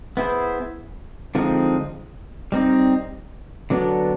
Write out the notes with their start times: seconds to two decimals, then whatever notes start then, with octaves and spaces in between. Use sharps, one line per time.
0.17 B3 E4 G#4 C5
1.35 D3 F3 G#3 C4 D#4
2.52 G3 C4 D#4
3.70 D3 F#3 B3 D4